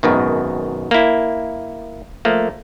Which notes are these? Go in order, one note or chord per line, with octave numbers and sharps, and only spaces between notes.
G#1 F#2 B2 D#3
A#3 E4
F3 A3 A#3